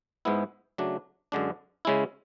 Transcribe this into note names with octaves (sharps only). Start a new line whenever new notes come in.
G#2 G#3 B3 E4
C#3 F#3 A3 D4
F#2 D3 G#3 D4
C#3 G#3 C#4 E4